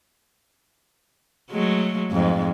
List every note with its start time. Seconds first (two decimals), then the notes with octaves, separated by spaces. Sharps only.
1.51 F#3 G#3 A3
2.11 F2 G#2